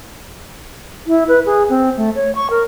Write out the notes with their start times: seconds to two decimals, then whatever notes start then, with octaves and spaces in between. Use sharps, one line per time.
1.07 E4
1.28 B4
1.46 G#4
1.69 C4
1.97 A3
2.16 C#5
2.35 C#6
2.50 A#4